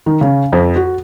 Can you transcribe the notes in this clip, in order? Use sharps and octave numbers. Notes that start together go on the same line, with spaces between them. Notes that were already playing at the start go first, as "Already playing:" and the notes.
D#3
C#3
F2
F#4